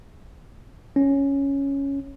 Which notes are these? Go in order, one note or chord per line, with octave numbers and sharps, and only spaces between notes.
C#4